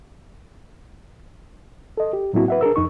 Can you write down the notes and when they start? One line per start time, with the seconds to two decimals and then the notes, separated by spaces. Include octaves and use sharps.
1.97 A4 D#5
2.13 G4
2.33 A2 F#3 A#3 C4 E4 F#4
2.48 B4 E5 F#5
2.61 D4 G#4 A#4 E6
2.76 F2 D#4 C#6